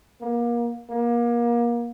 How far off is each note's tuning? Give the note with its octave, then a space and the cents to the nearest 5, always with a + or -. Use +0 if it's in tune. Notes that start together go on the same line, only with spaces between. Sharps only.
A#3 +30
A#3 +30